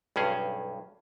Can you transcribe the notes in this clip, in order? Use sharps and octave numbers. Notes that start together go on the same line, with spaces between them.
B1 G2 C#4 G#4